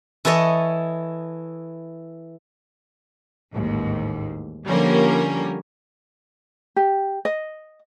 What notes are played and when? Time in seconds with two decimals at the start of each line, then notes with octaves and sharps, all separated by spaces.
0.25 E3 E4 A4 C#5 D#5
3.52 A1 D#2 G#2
4.67 D3 F3 G3 A#3 C#4 A#4
6.76 G4
7.25 D#5